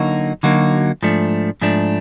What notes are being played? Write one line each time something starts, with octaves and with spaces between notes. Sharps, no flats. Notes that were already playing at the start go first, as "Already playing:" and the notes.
Already playing: D3 F#3 A#3 D#4 F#4
D3 F#3 A#3 D#4 F#4
G#2 F3 A3 D4
G#2 F3 A3 D4